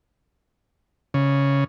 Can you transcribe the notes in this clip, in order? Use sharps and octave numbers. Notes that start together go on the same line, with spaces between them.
C#3